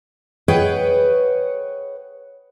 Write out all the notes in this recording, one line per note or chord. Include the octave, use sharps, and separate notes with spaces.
G#4 B4 C#5 D#5 F#5 G5